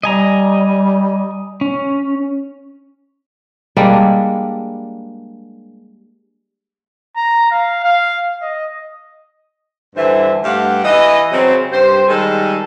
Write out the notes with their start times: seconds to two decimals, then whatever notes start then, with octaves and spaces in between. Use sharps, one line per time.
0.03 G3 D#5 G#5 A#5
1.61 C#4
3.77 G3 G#3 A#3 D4
7.16 A#5
7.51 F5
7.84 F5
8.42 D#5
9.96 G2 D3 E3 C5 E5
10.42 G2 A3 G4 F5 F#5
10.83 E3 E4 D#5
11.30 C#3 F#3 C4
11.70 G2 G4 C5
12.08 D#3 G3 G#3 G#4 A4